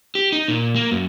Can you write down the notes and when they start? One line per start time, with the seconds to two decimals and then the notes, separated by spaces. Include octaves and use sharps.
0.15 G4
0.32 D#4
0.48 A#2
0.76 A#3
0.91 F#2